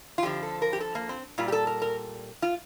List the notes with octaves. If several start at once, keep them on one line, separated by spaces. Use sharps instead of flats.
F4
F2 D3 F3 G4
A4
A#4
G4
A4
A#3
C4
A#2 G3 F4
G4
A4
A#4
A#4
F4